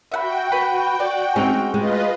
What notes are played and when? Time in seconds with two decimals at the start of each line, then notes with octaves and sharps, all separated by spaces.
0.12 F#4 E5 F#5 G5 B5
0.52 B4 B5
1.00 D5
1.36 G#3 C4 C#4 D#4
1.74 G#3 F4 B4 D#5